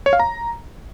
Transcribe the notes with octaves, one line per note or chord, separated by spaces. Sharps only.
C#5
F5
A#5